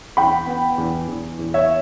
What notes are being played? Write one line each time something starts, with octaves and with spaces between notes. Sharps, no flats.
E2 G5 B5
B3
E2
E2
E2
C#5 E5